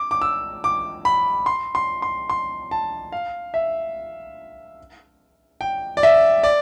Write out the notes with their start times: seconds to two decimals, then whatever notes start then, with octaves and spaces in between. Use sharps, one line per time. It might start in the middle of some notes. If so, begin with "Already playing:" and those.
Already playing: D6
0.11 D6
0.22 E6
0.64 D6
1.05 B5
1.46 C6
1.75 C6
2.02 C6
2.30 C6
2.71 A5
3.12 F5
3.54 E5
5.61 G5
5.97 D5
6.03 E5
6.43 D5